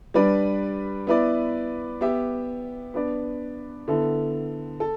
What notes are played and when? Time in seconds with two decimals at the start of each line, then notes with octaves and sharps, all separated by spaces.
0.14 G3 D4 B4 D5
1.07 B3 E4 B4 D5
2.01 B3 G4 E5
2.94 B3 D4 B4 D5
3.88 D3 B3 E4 A4
4.80 A4